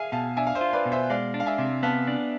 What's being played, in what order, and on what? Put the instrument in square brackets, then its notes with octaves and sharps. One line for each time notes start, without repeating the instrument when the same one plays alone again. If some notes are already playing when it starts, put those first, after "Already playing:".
Already playing: [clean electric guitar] G#4 [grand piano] E5 F5 G#5
[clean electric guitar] B2 [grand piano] F5 A5
[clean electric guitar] D4 [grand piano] E5 G#5
[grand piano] F5
C5 E5
[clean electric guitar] F4
[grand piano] C5
B4 D5
[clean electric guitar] B2
[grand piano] C5 E5
[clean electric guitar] G#3 [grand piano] D5 F5
[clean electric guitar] D4
[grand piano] F5
E5 G#5
[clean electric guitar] C3
[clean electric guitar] B3 [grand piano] F5 A5
[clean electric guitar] D4